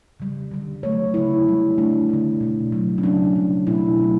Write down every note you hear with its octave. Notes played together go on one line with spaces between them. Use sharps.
C#3 G3
D3 G3
D3 F#3 A3 C#5
C#3 G3 E4
D3 G3
D3 A3 D4
D3 A3
B2 A3
B2 F#3 A3
C#4
C#3 F#3 A3 D4
C#3 G3
B2 A3 E4
B2 F#3 A3